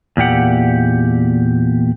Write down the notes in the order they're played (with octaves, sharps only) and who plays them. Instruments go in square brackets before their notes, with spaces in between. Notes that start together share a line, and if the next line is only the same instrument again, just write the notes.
[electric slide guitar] E2 A#2 G4 F#5